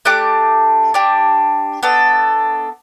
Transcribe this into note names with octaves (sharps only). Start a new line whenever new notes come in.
A3 D4 G4 D6 F#6
D4 G4
B3 D4 A4